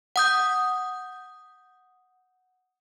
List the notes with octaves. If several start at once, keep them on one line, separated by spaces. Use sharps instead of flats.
F#5 D#6 G6